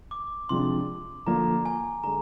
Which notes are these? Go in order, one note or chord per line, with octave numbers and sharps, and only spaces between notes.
D6
C3 F3 G#3 D4 C6
D3 F3 A#3 A#5
G#5
D3 G#3 A#5